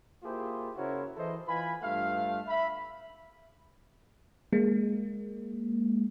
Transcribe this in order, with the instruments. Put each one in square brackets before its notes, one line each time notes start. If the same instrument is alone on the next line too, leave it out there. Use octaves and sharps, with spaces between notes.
[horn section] A#3 E4 F4 G4 G#4 C5
C#3 E4 F#4 A#4 C5 C#5
E3 E4 A4 C5 D#5
E3 F4 B4 G#5 B5
G2 A3 F4 F5
E5 B5
[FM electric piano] G#3 A#3